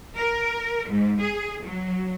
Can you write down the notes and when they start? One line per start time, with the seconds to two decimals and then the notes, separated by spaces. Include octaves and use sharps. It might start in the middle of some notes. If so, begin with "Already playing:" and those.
0.16 A#4
0.89 G#2
1.21 G#4
1.64 F#3